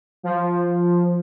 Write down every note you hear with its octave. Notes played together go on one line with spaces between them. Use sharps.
F3